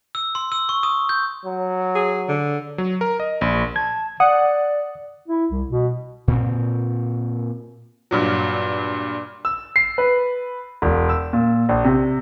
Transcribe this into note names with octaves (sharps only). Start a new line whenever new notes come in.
E6
C6
E6
C#6
D#6
G6
F#3
G#4
D3
F#3
A#4
D#5
A#1
A5 G#6
D5 F#5 D#6
E4
C2
B2
A#2 C4
G2 A#2 F#3
E6
C7
B4
E1
E6
A#2
A#1
C3